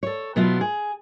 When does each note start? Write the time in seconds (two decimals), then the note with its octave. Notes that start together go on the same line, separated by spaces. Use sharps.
0.03 A4 C#5
0.36 B2 F#3 B3 E4 F4
0.61 G#4